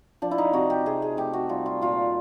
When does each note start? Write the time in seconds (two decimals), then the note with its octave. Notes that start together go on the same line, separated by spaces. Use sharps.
0.22 F3 D4
0.31 E4
0.38 D#4
0.53 C3 F#4
0.70 G4
0.86 C3 G#4
1.02 G#4
1.17 A3 G4
1.33 F#4
1.49 G3 F4
1.66 F4
1.82 A#2 F4